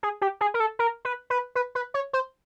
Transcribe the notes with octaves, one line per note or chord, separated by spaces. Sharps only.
G#4
G4
G#4
A#4
A4
A#4
B4
B4
B4
B4
C#5
C5